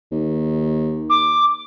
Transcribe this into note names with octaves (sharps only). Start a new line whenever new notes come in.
D#2
D6